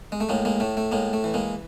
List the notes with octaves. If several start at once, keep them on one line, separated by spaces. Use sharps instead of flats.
G#3
A3
A2 G#3 A#3
G#3 A#3
A2 A3
A3
A2 G#3 A#3
A3
E3
G#3 A#3